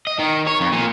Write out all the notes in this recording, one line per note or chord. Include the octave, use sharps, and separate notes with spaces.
D#5
D#3
C#5
F2
A#2